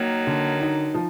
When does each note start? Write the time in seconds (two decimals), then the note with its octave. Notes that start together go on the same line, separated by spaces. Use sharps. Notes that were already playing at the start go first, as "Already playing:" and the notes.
Already playing: D#3 F#3 A#3
0.27 D3
0.61 D#4
0.94 F3